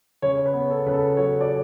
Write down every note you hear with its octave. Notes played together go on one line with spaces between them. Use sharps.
C#3 C#5
B4
B3
A4
C#3 B4
A4
F#3 C#5
D5